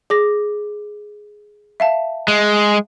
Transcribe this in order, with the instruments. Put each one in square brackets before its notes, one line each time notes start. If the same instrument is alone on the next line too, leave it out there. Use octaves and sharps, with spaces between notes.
[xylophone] G#4 D6 A#6
E5 F5 A5
[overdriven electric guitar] G#3